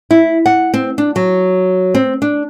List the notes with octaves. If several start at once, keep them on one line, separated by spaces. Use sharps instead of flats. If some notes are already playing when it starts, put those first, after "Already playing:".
E4
F#5
C4
D4
F#3
C4
D4